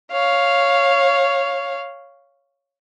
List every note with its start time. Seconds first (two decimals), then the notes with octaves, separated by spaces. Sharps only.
0.12 C#5 F5